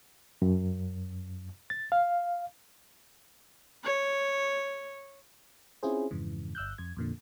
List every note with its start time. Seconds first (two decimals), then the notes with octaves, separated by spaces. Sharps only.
0.42 F#2
1.70 A6
1.92 F5
3.84 C#5
5.83 C4 C#4 E4 F4 G#4 C5
6.11 F2 G#2 C#3 E3
6.55 G1 E6 F#6 G6
6.78 F2 G#6
6.97 F2 A#2 D3